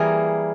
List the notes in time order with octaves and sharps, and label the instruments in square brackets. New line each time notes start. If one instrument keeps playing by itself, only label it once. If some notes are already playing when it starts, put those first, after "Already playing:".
Already playing: [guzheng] E3 G3 A#3 G#4 A#4